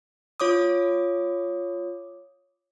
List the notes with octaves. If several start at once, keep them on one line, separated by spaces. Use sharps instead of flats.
F4 C#5 D6 D#6